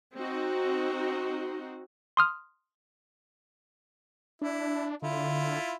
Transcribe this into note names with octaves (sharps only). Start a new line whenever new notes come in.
C4 D#4 F#4
C6 D#6 F6
D4 E4
D3 E4 F4